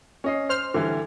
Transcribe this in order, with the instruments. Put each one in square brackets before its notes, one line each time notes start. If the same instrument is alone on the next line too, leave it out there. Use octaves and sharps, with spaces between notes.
[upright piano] C#4 D#5 C7
[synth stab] C5 F6 [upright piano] C7
[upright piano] D3 E3 G3